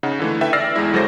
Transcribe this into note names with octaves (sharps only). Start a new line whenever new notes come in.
C#3 D#4 F#5
D3 E3 A3
A4 B4 E5 G5
D5 E6 F6 A6 A#6 C7
E2 G#3 E4
G1 F#3 G#3 A4 C5 A#6